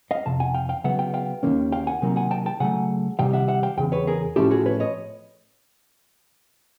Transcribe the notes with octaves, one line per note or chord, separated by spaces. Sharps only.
D#5 F5
F2 C3 A5
F#5 G#5
F5 G5
F5 G5
C#3 F#3 B3 E5 F#5
F5 G5
F5 G5
D#2 D#3 G3 A#3 C#4
F5 G5
F#5 G#5
C3 D#3 F#3 A#3
F#5 G#5
G5 A5
G5 A5
C#3 F#3 A3 F#5 G#5
C3 D#3 G3 F5 G5
E5 F#5
E5 F#5
F5 G5
E2 C#3 G5
B4 C#5
G#4 A#4
A2 F3 A3 C#4 E4 G4 A4
F#4 G#4
B4 C#5
C#5 D#5